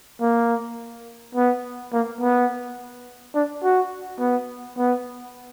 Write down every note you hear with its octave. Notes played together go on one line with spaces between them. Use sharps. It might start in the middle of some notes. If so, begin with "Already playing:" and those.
A#3
B3
A#3
B3
D4
F#4
B3
B3